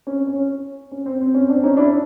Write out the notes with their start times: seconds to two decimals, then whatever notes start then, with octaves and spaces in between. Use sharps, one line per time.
0.07 C#4
0.27 C#4
0.92 C#4
1.06 C4
1.21 C4
1.34 C#4
1.49 C4 D4
1.63 C#4 D#4
1.77 D4 E4